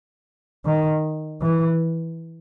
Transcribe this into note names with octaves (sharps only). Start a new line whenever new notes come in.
D#3
E3